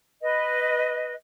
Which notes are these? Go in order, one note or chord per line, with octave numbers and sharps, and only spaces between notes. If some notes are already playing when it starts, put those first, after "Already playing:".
B4 D#5